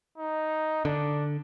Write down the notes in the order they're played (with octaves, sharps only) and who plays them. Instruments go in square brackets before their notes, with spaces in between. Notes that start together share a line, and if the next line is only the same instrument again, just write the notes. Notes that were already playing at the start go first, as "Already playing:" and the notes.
[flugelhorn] D#4
[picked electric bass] D3 [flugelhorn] D4